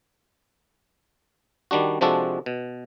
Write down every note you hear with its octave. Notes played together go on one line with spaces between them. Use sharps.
D#3 G3 D4 F#4
C3 F3 G#3 D4 F#4 A4
B2